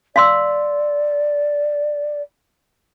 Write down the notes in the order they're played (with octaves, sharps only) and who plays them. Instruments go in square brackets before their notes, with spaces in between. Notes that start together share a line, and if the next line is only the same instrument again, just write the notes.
[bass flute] D5 [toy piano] F5 C6 E6